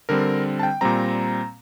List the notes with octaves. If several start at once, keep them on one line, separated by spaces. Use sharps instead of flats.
D3 G3 C4 A#4
A5
G5
A#2 G3 C4 A#5